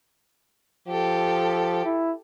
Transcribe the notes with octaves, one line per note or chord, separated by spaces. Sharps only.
F3 G4 A4
E4